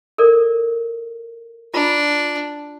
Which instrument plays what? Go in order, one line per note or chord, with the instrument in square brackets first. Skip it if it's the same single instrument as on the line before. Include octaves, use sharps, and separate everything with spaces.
[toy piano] A4 A#4 D5
[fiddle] D4 [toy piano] F4 A#5 B5